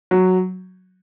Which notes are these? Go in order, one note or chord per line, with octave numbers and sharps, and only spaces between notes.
F#3